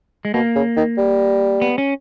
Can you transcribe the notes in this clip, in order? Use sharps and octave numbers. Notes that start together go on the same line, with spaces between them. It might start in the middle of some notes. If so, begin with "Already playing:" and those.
G#3
B2 A#3
C#3
D#3
G3
B3
C#4